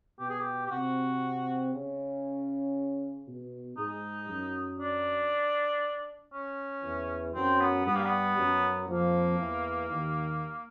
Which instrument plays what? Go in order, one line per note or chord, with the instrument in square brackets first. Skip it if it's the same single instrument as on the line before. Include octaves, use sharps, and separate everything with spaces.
[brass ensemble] B2 B3 [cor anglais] G4
[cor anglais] G#4
G4
G4
[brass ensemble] C3 C4 [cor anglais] F#4
[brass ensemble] C#3 C#4
B2 B3
[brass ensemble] G#2 G#3 [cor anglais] D#4
[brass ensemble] F#2 F#3
[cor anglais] D4
C#4
[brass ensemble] E2 E3
[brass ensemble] F#2 F#3 [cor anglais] C4
[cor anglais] B3
[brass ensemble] G2 G3 [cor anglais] B3
[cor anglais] A#3
B3
[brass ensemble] F#2 F#3
[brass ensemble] F2 F3 [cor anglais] A#3
[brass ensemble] E2 E3
D#2 D#3